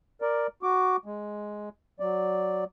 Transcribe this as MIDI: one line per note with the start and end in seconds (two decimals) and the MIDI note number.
0.22 0.47 70
0.22 0.47 74
0.63 0.97 66
0.63 0.97 86
1.06 1.69 56
2.00 2.64 54
2.00 2.64 74